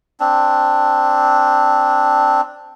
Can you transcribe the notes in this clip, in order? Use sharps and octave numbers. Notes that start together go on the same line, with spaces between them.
C4 D4